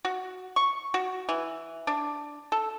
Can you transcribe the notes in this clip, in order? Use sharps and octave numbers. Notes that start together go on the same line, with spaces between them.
F#4
C#6
F#4
E3
D4
A4